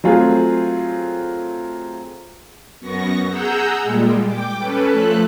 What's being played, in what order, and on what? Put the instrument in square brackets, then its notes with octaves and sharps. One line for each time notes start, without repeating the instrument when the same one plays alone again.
[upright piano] F#3 A3 C4 F4 G#4
[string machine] F#2 B3 C#6 A#6
G#4 F#5 A#5 E6 G6
A#2 G3 G#3
G5 D6
C#4 A4 B4
F3 A3 A4 F#6